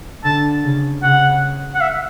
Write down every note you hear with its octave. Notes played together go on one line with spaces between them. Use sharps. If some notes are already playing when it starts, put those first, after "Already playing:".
D3 A5
C#3
C#3 F#5
F#5
E5